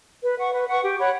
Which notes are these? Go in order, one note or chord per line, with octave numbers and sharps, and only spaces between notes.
B4
F#5 C#6
B4
F#5 C#6
G4
C#5 F#5 B5